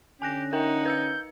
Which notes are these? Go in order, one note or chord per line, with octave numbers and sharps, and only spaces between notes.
D3 C#4 G4 G#5 F#6 A#6
D#4 A#4 F#5 G5 F#7
B4 E6 G6 C#7